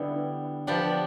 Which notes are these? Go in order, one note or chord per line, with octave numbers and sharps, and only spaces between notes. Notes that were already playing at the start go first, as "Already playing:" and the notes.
Already playing: D3 G3 B3 E4
F3 B3 D4 G4